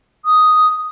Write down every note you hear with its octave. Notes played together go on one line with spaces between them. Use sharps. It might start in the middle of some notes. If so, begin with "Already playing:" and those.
D#6